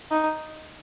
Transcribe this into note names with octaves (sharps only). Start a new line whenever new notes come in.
D#4